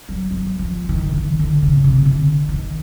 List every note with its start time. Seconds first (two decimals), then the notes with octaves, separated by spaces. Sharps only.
0.09 F#3
0.31 F#3
0.59 F3
0.89 D#3
1.09 D3
1.17 D#3
1.39 D3
1.62 C#3
1.73 B2
1.84 C3
2.05 D3
2.49 D#3